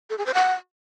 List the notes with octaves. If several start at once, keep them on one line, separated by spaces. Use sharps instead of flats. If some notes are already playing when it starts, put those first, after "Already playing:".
A4
G#4
C5
F#5